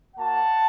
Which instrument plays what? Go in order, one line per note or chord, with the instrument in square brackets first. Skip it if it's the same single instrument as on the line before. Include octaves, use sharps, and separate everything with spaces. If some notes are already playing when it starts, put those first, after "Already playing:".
[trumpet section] A#3 F#4 F#5 A5